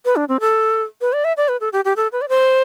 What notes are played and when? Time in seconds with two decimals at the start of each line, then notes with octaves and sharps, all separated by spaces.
0.05 B4
0.16 D4
0.29 C4
0.40 A4
1.01 B4
1.13 D5
1.24 E5
1.37 D5
1.48 B4
1.61 A4
1.73 G4
1.85 G4
1.96 A4
2.12 B4
2.22 D5
2.29 C5